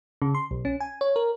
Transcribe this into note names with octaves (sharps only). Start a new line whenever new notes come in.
C#3
C6
B1
C#4
G#5
C#5
A#4